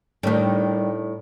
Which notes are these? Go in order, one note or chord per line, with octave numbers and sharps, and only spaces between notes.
A2 D#3 G3 D4